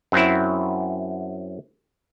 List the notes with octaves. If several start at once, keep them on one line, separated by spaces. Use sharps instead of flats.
F#2 F#3 C4 E4